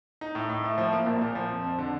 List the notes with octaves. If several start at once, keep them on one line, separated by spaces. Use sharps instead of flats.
D#4
A2
A2
A3
F3
A#3
A#1
A#2
F3
F2
F2
D3